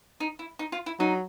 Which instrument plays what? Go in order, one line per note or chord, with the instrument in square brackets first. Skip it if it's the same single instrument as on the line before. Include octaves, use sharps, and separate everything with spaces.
[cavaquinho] D#4
E4
D#4
F4
E4
[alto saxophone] F#3 [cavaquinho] D#4